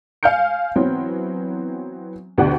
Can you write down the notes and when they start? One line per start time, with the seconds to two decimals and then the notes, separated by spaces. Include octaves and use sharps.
0.23 F5 G#5 F6 G6 C#7
0.76 E3 F#3 B3 C4
2.38 D2 B2 D4 F#4 G4 F#5